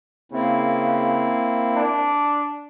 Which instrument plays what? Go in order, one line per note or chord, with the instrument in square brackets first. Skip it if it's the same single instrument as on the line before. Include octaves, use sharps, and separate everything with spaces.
[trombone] C#3 [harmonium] A#3 C4 E4
[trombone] D4